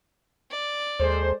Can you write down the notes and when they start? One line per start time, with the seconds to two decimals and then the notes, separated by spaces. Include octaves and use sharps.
0.51 D5
1.00 D#2 G#3 A4 C5